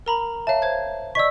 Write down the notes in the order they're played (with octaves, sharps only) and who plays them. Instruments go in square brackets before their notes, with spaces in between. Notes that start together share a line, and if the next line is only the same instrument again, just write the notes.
[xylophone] A#4 A#5 B5
[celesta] C#5 E5 [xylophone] F5 A5
[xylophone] C5 G#6
[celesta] D5 D#5 B6 [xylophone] C#6 E6